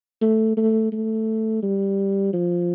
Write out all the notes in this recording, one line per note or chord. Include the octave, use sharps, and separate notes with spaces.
A3
A3
A3
G3
F3